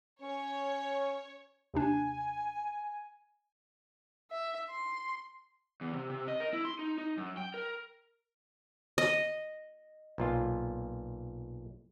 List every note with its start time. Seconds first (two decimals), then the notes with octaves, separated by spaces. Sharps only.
0.22 C#4 C#5
1.74 D#2 C3 D4 G#5
4.31 E5
4.70 C6
5.81 E2
5.93 C3
6.10 C3
6.28 D#5
6.40 A#4
6.53 E4
6.65 C6
6.79 D#4
6.98 D#4
7.17 F#2
7.37 G5
7.54 A#4
8.98 D#5
10.18 B1 A#2 F4